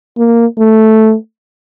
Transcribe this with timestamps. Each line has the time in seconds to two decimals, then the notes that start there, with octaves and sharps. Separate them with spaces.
0.18 A#3
0.58 A3